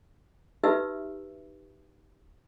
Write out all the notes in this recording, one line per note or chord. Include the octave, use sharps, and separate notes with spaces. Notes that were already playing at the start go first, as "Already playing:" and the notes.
D#4 F#4 G4 B4 E5 E6